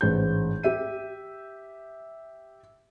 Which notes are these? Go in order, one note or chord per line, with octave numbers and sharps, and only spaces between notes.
A1 G#2 C5 G6
G4 E5 D#7